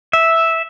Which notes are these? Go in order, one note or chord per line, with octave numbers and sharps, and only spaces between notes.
E5